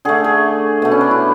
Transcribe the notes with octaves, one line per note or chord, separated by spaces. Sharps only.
D3 A3 G#4
G#4
B2 A3
C#4
D4
E4